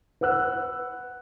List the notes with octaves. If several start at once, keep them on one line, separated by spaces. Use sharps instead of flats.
B4 F#5 E6 F#6